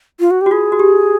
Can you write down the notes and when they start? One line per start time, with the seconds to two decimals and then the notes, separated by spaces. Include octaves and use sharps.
0.20 F4
0.31 F#4
0.41 G4
0.46 F#4
0.51 F4 G#4
0.72 F#4
0.79 G4